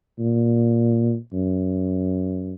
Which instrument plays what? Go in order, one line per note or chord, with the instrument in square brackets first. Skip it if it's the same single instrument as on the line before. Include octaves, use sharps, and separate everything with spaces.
[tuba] A#2
F#2